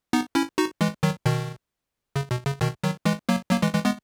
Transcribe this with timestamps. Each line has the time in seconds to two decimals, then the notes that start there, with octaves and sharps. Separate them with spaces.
0.13 B3 D#4
0.35 C#4 E4
0.58 D#4 F#4
0.81 E3 G#3
1.03 D#3 F#3
1.25 B2 D#3
2.16 C#3
2.31 B2
2.46 C#3
2.61 B2 D#3
2.83 D#3 F#3
3.05 E3 G#3
3.29 F#3 A#3
3.51 F#3 A#3
3.62 E3 G#3
3.74 E3 G#3
3.85 G#3 B3